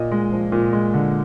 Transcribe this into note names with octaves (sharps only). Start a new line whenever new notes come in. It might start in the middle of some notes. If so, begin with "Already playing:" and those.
Already playing: A#2 D#5
G#3
F3
A#2
G#3
D3